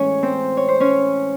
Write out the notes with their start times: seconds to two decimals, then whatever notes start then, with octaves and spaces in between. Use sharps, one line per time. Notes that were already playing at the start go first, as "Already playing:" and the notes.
Already playing: A2 E3 G#3 C#4 C#5
0.23 C4 C5
0.57 C#5
0.68 C5
0.80 C#4 C#5